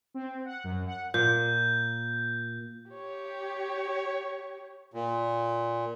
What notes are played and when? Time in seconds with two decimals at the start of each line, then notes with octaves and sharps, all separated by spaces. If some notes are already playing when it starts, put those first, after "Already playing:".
0.14 C4
0.45 F#5
0.64 F#2
0.86 F#5
1.14 A#2 G6
2.90 G4 C#5
4.94 A#2